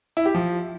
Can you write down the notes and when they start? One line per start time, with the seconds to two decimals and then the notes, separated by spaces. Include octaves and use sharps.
0.17 E4
0.26 G4
0.34 F3